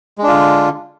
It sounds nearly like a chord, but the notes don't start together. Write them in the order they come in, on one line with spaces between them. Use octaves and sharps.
G#3 D4 F4 D3